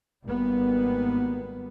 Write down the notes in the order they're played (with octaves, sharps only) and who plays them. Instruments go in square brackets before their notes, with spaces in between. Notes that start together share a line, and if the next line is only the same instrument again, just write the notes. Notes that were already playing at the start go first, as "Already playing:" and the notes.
[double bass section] G#1 G3 A#3 B3